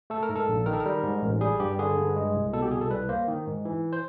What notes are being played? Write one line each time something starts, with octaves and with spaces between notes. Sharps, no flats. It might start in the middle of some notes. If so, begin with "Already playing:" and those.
A3 A4
A#4
G#2
A4
A#1
D#3 A#4
A4
A#4
G3
G#2
A1
G3 G#4
G2 G4
D3 G#4
G2
G#3
C2
B2 A4
G4
C2 G#4
A4
G3 B4
A#3 C5
D#3
G#2
E3
C5